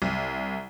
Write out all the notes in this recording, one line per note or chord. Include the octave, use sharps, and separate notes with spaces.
C2